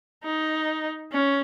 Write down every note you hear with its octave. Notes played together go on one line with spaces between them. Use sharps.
D#4
C#4